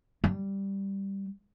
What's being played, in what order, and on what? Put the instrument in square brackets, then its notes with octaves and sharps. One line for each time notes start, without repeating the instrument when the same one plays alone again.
[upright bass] G3